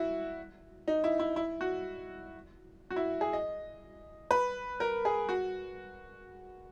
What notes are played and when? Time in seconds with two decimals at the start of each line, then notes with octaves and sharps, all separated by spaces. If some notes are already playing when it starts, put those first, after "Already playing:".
Already playing: E4 F#4
0.88 D#4
1.04 E4
1.19 E4
1.36 E4
1.61 F#4
2.91 F#4
2.96 E4
3.21 G#4
3.33 D#5
4.31 B4
4.80 A#4
5.05 G#4
5.29 F#4